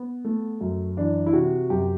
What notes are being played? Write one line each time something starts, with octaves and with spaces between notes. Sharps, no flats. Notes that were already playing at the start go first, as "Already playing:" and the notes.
Already playing: B3
A3
F#2
E3 D4
E4
C3 F#4
F#2 G4